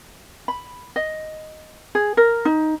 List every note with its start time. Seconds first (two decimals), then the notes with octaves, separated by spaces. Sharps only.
0.48 B5
0.96 D#5
1.95 G#4
2.17 A#4
2.45 D#4